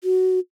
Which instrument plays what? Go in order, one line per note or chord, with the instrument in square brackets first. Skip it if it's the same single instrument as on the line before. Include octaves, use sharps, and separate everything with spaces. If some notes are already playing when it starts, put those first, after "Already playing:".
[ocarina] F#4